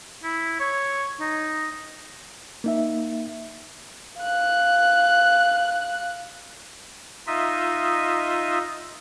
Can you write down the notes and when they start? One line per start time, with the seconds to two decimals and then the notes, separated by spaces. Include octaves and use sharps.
0.24 E4
0.60 C#5
1.20 D#4
2.64 A#3 D#4 E5
4.20 F5 F#6
7.27 D#4 F4 D#5 E5